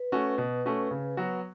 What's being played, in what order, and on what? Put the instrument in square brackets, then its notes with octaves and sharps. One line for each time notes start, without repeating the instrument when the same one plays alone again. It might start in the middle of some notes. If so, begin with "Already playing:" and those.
Already playing: [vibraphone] B4
[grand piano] A3 C#4 F#4
B2
A3 C#4 F#4
C#3
F#3 B3 F#4